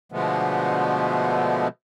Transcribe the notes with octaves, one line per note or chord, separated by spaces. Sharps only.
B2 D3 F3 G#3 A3 B3